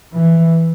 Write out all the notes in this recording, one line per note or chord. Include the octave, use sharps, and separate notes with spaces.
E3